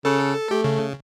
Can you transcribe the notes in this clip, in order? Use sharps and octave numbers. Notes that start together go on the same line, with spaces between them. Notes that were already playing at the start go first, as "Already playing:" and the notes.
C#3 A4
A3 G4
C#3